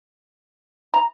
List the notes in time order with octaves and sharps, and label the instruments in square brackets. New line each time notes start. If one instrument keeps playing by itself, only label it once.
[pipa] A#5